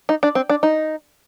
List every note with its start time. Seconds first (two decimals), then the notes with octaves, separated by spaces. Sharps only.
0.09 D#4
0.23 D4
0.35 C4
0.49 D4
0.63 D#4